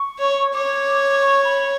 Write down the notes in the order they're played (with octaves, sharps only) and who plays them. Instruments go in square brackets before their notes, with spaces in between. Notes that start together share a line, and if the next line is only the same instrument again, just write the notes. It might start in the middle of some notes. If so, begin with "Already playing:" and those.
Already playing: [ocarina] C#6
[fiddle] C#5
[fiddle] C#5 [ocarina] D6
[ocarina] C#6
B5